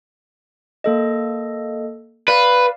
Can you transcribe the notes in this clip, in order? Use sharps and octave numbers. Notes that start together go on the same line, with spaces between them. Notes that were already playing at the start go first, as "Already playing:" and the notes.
A#3 A4 D#5
B4 D5 F5